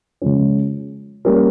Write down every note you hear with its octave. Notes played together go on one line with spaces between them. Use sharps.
C#3 F3 G#3 C#4
G3 A#3 C#4 G4 A#4